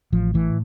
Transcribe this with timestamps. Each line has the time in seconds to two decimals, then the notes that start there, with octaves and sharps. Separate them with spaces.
0.12 A1 F3
0.34 A2 E3